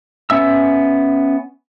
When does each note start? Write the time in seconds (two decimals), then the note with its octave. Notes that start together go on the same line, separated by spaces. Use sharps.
0.30 B3 C#4 E5 E6